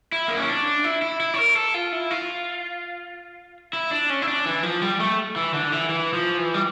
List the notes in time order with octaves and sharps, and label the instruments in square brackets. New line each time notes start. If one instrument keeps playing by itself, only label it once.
[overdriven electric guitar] E4
A#3
C#4
D4
E4
E4
E4
C#5
A#4
A4
F4
E4
F4
E4
D4
C#4
E4
D4
E3
F3
G3
A3
E3
D3
E3
E3
F3
E3
G3